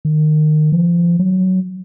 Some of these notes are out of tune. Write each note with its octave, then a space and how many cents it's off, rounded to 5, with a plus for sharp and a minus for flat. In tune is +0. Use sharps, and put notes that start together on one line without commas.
D#3 -25
F3 -25
F#3 +10